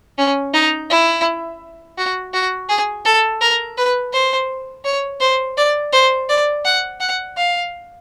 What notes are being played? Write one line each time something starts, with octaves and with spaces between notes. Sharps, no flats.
C#4
D#4
E4
F#4
F#4
G#4
A4
A#4
B4
C5
C#5
C5
D5
C5
D5
F#5
F#5
F5